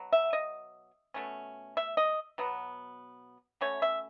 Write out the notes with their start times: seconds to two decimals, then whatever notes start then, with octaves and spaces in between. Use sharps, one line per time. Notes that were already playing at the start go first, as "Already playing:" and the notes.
Already playing: B2 F#3
0.12 E5
0.33 D#5
1.14 B2 A3 C#4
1.77 E5
1.97 D#5
2.38 B2 F#3 B3
3.61 B2 A3 C#4 C#5
3.82 E5